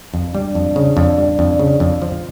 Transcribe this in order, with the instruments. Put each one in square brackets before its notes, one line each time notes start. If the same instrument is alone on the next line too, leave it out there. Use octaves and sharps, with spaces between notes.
[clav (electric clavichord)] F2
[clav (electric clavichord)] G3 [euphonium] D4
[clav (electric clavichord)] F2
C#3
F2
G3
F2
C#3
F2
F3